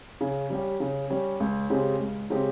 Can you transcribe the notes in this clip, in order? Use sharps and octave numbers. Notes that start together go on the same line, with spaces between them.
C#3
G3 C#4 G4
C#3
G3 C#4 G4
C#2
C#3 G#3 C4 G4
C#2
C#3 G#3 C4 G4